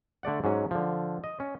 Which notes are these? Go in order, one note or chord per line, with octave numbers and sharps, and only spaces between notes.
D3 A3 D5 F#5
G#2 F#3 C#4
D3 F3
D#5
C#4